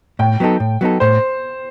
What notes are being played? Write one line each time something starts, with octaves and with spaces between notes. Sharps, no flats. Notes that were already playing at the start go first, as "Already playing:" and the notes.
A2 G5
F#3 B3 D#4 A4
A2
F#3 B3 D#4 A4
A2 C5